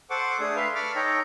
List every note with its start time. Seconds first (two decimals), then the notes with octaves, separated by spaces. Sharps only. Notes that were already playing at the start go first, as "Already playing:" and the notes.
0.10 A4 C5 F#5 C#6 D6
0.40 A3 D4 G#4 D#6
0.56 B4 E5 F5 C6
0.75 A5 B5 C#6 D6 F6
0.95 D#4 A4 C#5 G5 A#5